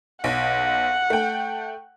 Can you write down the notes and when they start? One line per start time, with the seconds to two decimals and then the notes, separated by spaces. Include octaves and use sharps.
0.24 B1 F#5
1.10 A3 G5